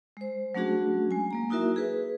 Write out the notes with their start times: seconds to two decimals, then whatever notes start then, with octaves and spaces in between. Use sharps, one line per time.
0.17 G#3 C5
0.55 F#3 A3 C#4 D4 F#4 G#4
1.11 G#3 G#5
1.31 F#3 A#3 A#5
1.50 A#3 D#4 E4 F#4 A#4 E5
1.76 G#4 B4